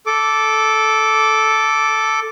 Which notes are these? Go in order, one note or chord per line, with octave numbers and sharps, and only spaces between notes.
A4 D6